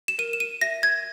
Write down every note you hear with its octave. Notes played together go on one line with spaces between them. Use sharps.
E7
A#4 D#7
E7
D#7
E5 A#6
G#6